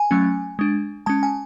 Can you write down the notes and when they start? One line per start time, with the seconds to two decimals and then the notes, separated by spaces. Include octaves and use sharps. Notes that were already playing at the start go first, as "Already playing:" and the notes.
Already playing: G#5
0.11 F#3 A3 C#4
0.59 G#3 D4
1.06 G#3 C#4 A5
1.23 G#5